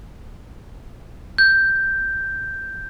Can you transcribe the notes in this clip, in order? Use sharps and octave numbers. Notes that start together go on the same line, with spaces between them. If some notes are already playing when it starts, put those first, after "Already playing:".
G6